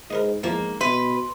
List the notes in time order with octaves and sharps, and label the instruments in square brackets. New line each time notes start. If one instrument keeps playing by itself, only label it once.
[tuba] G#2 [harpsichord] A#4 B4 D#5
[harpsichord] E2 F3 [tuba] G#2 [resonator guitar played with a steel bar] A#3
[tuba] B2 [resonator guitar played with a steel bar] B4 [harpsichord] E5 [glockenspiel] C6